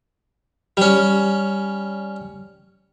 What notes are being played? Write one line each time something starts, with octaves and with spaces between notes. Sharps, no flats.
G3 C#4